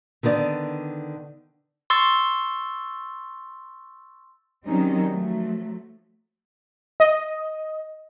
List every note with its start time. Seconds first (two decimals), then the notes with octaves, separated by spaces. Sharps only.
0.23 D3 D#3 B3 D5
1.90 C6 C#6 E6 A6
4.65 D#3 F#3 G3 C4 C#4 D#4
5.09 F3 F#3 A3
7.00 D#5